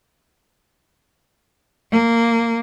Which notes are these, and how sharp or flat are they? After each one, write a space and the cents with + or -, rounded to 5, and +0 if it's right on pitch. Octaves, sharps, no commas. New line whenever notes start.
A#3 -15